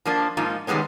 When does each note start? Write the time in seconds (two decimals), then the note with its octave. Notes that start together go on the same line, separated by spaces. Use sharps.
0.05 F3 A#3 D4
0.37 G#2 F3 A#3 D#4 F4
0.67 C3 D#3 G3 G#3 B3 C#4